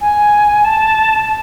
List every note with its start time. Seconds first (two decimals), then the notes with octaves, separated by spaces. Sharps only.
0.01 G#5
0.65 A5